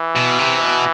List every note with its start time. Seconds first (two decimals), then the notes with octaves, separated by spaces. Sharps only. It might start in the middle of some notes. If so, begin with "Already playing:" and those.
Already playing: E3
0.16 B2
0.39 C3
0.61 B2